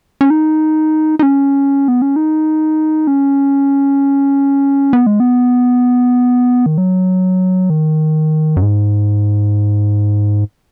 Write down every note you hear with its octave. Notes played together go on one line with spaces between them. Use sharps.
C#4
D#4
D#4
C#4
B3
C#4
D#4
C#4
B3
G#3
B3
D#3
F#3
D#3
F#2
G#2